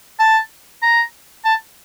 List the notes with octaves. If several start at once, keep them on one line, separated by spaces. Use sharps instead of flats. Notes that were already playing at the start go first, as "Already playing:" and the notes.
A5
A#5
A5